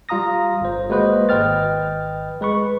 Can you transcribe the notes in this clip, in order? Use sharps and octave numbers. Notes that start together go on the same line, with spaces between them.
G3 F4 F5 A#5 D#6 A#6
G1 C5
G#3 A#3 F#4 B4 C5 D#5
G#1 B4 D#5 G5 F6 A6
G#3 B4 B5 C#6